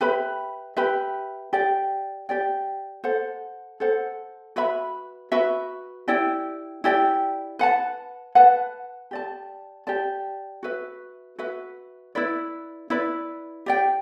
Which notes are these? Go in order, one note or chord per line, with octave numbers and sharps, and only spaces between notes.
G4 B4 E5 B5
G4 B4 E5 B5
G4 D5 G5
G4 D5 G5
A4 C5 F#5
A4 C5 F#5
F#4 B4 E5 B5
F#4 B4 E5 B5
E4 G4 D5 G5
E4 G4 D5 G5
B4 F#5 A5
B4 F#5 A5
G4 D5 A5
G4 D5 A5
F#4 B4 E5
F#4 B4 E5
E4 B4 D5
E4 B4 D5
G4 D5 G5